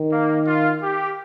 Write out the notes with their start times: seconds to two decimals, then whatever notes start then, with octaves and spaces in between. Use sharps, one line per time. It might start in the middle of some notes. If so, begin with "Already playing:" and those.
Already playing: D#3
0.10 A#3
0.46 F4
0.82 G4